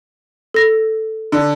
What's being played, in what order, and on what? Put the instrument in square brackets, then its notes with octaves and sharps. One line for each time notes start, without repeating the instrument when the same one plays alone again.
[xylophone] A4 A#6
[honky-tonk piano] D3